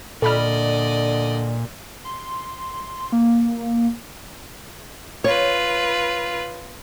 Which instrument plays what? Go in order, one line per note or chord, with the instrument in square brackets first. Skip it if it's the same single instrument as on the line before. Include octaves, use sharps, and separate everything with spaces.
[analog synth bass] A#2 [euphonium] D3 [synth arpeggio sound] A4 B5 F6 [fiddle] D5 D#5
[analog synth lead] C6
A#3
[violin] F4 B4 [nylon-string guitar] C#5